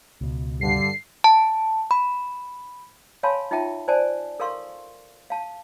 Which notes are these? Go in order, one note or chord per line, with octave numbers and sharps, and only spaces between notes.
C#2 B2
G2 D3 C7
A5
B5
C#5 F5 G#5 A5 B5 C6
D#4 F4 E5 G5 A5
C5 D5 G#5 A5
A4 A#4 F5 C6 C#6
F5 A5